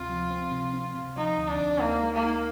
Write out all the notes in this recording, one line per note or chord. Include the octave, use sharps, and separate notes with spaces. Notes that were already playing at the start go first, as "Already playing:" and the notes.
Already playing: D2 C3 C4 F4
F3
C4
C3
C4
C3
F3 D#4
D2
D4
D2
A#3 D#4
G#3
A#3
D#4